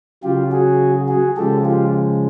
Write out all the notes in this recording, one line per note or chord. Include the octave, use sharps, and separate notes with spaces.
C#3 F#3 F4 G4
F#4 G#4
F#4 G#4
C#3 F3 G#3 G4 A4
F4 G4